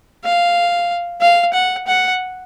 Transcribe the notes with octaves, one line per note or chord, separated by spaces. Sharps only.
F5
F5
F#5
F#5